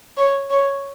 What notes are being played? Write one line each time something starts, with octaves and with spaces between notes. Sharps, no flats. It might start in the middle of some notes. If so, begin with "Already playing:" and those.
C#5
C#5